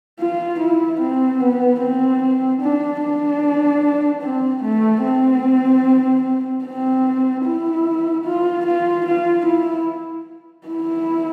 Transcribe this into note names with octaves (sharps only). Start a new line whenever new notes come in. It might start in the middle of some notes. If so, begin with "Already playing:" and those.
F4
E4
C4
B3
C4
D4
D4
C4
A3
C4
C4
E4
F4
F4
F4
E4
E4